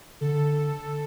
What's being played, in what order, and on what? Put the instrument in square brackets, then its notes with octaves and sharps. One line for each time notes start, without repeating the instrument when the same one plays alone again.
[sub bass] D3 [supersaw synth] A4